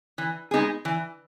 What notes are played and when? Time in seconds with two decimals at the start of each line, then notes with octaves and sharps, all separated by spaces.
0.18 E3
0.51 G#3 B3 D#4 G#4
0.85 E3